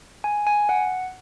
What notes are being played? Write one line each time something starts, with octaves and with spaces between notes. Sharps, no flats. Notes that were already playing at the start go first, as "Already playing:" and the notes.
G#5
G#5
F#5